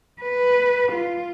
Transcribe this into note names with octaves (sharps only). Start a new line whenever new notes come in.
B4
F4